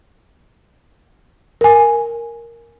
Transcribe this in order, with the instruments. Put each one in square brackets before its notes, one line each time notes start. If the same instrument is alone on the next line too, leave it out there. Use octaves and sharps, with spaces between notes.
[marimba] A#4 G#5